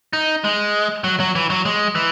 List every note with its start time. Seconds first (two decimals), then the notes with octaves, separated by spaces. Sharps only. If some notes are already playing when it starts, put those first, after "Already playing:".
0.13 D#4
0.44 G#3
1.04 F#3
1.20 F#3
1.35 E3
1.50 F#3
1.65 G#3
1.95 E3